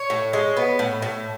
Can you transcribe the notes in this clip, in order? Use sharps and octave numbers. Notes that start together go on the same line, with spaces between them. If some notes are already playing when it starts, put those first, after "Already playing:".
Already playing: C#5
A2
G#3
B3
A2
A2